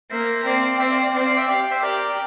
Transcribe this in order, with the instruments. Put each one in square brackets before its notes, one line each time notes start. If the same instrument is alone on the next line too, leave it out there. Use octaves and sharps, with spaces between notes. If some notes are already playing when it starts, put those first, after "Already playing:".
[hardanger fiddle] A#3 [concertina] C5 E5
[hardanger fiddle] C4 [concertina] D5 F5
[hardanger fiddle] C4 [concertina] E5 G5
[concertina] D5 F5
D5 F5
[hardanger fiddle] C4 [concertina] D5 F5
[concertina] D5 F5
E5 G5
[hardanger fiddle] G4 [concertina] D5 F5
[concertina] C5 E5
[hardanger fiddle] G4 [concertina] A#4 D5